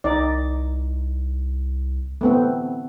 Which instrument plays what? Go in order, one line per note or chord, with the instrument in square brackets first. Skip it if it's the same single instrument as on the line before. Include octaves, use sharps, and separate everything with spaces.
[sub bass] C2 [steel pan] D#4 D5
[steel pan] A3 B3 C4